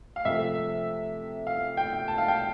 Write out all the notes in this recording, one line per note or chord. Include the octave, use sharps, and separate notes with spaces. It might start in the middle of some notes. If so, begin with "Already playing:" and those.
F5
C3 F3 A3 E5
F5
G5
A5
F5
G5